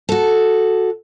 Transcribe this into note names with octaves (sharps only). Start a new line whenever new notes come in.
F#4 A4